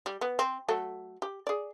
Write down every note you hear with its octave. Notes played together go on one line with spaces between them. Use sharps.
G3
B3
C4
F#3 A3 A4
G4
G#4 D5